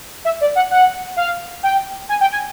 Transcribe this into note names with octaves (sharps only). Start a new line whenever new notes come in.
E5
D5
F#5
F#5
F5
G5
G#5
G5
G#5